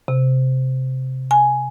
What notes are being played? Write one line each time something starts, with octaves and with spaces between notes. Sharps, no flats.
C3
G#5